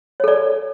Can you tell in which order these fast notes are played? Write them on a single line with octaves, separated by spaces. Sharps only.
C#5 A4 D5